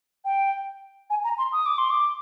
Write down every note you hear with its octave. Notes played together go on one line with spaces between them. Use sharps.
G5
G#5
A#5
C6
D#6
D6
C6
D6